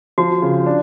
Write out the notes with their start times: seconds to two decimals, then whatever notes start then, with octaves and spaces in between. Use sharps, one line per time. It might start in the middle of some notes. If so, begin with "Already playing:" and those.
0.18 F3 F#4
0.42 C#3
0.66 D4